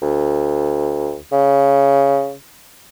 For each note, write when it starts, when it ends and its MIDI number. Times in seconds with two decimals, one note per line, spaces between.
0.02 1.16 38
1.32 2.32 49